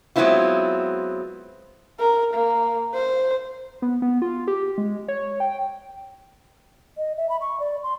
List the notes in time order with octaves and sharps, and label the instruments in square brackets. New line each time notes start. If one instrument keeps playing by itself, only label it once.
[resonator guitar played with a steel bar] F#3 G#3 B3 C4 E4 F4
[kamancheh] A#4
A#3
C5
[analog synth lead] B3
B3
F4
G4
G#3
C#5
G5
[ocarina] D#5
E5
B5
C#6
D5
C6